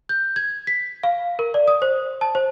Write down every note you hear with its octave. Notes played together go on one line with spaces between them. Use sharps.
G6
G#6
B6
F5
A#4
D5
D#6
C5
A5
C5